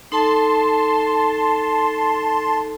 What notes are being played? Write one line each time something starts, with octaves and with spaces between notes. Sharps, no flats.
D#4 A4 A5 C6